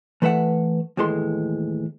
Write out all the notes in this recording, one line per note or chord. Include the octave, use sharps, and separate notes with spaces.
E3 A3 B4 E5 F#5
D#2 A2 E3 G#3 A4 C6